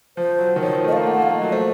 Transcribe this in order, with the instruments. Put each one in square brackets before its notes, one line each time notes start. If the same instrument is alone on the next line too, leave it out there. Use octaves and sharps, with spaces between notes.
[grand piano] F3 [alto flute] C5
[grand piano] F#3
D#3
[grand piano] F3 [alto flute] C#5
[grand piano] D#3
F3
[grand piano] A3 [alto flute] D#5
[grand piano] A#3 [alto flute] F5
[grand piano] A3
[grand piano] A#3 [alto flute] F#5
[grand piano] A#3 [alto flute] F5
[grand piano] A3
[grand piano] F#3 [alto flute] D#5
[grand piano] A3 [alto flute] C5